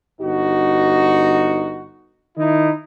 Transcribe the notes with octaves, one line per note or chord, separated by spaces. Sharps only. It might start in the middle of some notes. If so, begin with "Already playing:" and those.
G1 D#4 F#4
D#3 D#4 E4